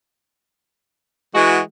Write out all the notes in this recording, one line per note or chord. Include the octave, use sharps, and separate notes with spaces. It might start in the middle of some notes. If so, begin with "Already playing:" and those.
E3 G#3 F#4